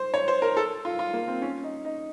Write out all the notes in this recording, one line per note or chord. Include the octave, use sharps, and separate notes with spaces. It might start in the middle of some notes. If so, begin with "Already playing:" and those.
Already playing: C5
C#5
C5
A#4
A4
F4
F4
A#3
C4
C#4
D#4
D#4